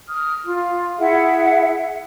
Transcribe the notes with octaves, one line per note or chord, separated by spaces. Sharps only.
D#6 F6
F4
E4 G#4 E5 F#5